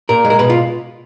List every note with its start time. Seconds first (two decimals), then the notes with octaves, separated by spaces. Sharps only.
0.09 A#2 A#4
0.25 G#3
0.30 A#4
0.39 B2 B4
0.50 F4